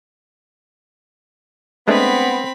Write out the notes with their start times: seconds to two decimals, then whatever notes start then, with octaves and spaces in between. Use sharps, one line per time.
1.88 G#3 A3 B3 C4 D4 B5